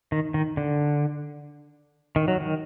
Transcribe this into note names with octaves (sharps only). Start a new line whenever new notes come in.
D#3
D#3
D3
D#3
F#3
D#3